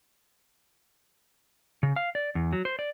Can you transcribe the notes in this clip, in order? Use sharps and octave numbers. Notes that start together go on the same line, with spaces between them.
C#3
F5
D5
E2
F#3
C5
D5